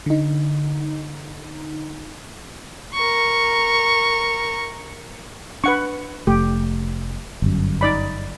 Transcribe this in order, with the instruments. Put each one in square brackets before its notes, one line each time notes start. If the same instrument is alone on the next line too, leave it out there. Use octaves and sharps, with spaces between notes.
[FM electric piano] D3 D#4
[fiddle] A#4 C#6
[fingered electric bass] D4 [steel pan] B4 F#5 C#6
[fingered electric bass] F1 A3 [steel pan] G4
[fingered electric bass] G1 F#2
[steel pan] D#4 D5 B5